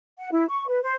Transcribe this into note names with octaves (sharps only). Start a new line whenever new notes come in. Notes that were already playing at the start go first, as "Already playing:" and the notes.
F#5
E4
C#6
B4
C5